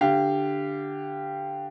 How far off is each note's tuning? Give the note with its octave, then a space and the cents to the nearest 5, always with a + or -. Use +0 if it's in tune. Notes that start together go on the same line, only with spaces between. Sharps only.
D3 +0 G4 +0 F5 -25